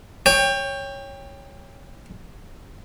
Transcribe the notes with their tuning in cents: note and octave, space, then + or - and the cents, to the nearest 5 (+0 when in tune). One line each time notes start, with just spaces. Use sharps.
C#5 +0 G5 +20